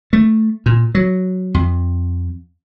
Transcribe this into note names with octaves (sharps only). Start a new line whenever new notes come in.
A3
A#2
F#3
F2